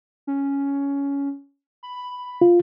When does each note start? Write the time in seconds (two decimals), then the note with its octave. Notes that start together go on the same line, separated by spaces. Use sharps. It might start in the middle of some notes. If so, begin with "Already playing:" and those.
0.27 C#4
1.83 B5
2.41 F4